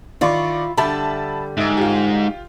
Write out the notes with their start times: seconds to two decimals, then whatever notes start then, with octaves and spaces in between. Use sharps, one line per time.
0.21 D#3 E4 F4 D5 C#6
0.77 D3 G3 E5 A5 B5
1.57 G#2 E5 E6
1.77 F4 G4